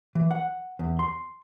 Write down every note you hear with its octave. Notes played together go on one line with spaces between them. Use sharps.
E3
F#5
E2
C6